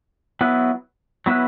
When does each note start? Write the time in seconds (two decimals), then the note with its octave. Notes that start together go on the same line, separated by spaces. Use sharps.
0.41 F#3 B3 E4 B4
1.26 F#3 B3 E4 B4